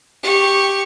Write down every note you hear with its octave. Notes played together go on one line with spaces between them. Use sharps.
G4 C#6